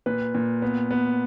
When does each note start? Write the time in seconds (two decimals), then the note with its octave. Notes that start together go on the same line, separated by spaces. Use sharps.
0.06 A#2 B4
0.35 A#2
0.62 B3
0.91 B3